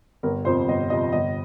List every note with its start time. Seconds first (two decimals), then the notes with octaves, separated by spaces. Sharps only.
0.23 G1 A#4
0.45 F2 C3 F3 C5
0.68 G1 D#5
0.90 F2 C3 F3 D#5
1.12 G1 D#5